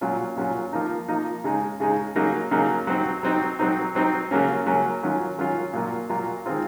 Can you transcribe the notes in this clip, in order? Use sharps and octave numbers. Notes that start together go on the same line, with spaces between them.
A#2 F#3 C#4 F4
A#2 F#3 C#4 F4
F3 A#3 D#4
F3 A#3 D#4
C#3 G#3 D#4
C#3 G#3 D#4
C#3 F#3 A#3 D#4
C#3 F#3 A#3 D#4
F#3 C4 D#4
F#3 C4 D#4
F#3 C4 D#4
F#3 C4 D#4
C#3 F#3 A#3 C#4
C#3 F#3 A#3 C#4
D#3 F#3 C#4 F4
D#3 F#3 C#4 F4
A#2 F#3 A#3 F4
A#2 F#3 A#3 F4
D#3 G#3 C4 F4